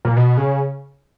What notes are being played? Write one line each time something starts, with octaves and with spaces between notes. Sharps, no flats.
A#2
B2
C#3